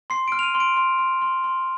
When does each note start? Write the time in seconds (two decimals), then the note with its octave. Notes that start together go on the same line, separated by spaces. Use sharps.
0.10 C6 C7
0.28 F6 D7
0.39 F7
0.43 D#7
0.55 C6
0.60 D7
0.77 C6
0.99 C6
1.22 C6
1.44 C6